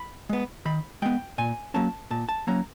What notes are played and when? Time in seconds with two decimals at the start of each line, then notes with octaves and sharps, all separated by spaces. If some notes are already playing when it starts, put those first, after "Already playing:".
Already playing: B5
0.29 G#3 B3
0.65 D#3 B5
1.02 G#3 B3 G5
1.38 A#2 G#5
1.74 F#3 A#3 C#4 A5
2.11 A#2 A5
2.29 A5
2.47 F#3 A#3 C#4 A#5